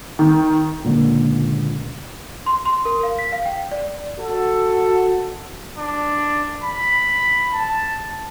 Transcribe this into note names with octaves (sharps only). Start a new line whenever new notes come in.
D#3
C#2 A#2 D3 A#3
C6
C6
A#4
F5
B6
F5
G5
D5
F#4 A4
D4
B5
A5